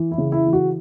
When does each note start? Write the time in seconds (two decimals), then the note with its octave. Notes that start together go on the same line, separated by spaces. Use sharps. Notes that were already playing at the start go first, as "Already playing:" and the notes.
Already playing: E3
0.11 E4
0.18 C#3
0.32 E4
0.46 E3
0.53 F#4